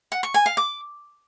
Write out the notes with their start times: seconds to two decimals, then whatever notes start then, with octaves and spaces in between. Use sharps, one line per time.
0.12 F#5
0.23 C#6
0.34 G#5
0.46 F5
0.57 D6